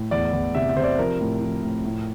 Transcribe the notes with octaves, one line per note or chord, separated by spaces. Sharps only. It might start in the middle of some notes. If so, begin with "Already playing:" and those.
Already playing: A2
E2 D5
E2
C3 E5
E5
C3 C5
D5
F3 A#4
A2
F3
A2
A2